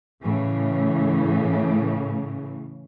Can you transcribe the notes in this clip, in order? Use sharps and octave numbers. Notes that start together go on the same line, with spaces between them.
A2 C#3 E3